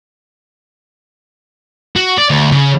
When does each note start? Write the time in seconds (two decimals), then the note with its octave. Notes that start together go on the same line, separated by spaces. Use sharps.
1.96 F#4
2.18 D5
2.30 D2
2.52 C#3